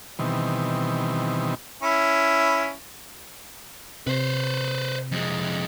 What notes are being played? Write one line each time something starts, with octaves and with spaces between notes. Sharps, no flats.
B2 D#3 E3 G3 C4
C#4 E4
C3 B4 C5
F2 G#3